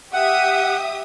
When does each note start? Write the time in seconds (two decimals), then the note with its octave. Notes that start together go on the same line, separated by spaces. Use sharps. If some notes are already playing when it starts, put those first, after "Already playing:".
0.13 G4 E5 F#5 D#6